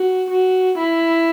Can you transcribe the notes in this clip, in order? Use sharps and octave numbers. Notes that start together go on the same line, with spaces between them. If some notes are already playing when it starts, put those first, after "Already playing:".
Already playing: F#4
F#4
E4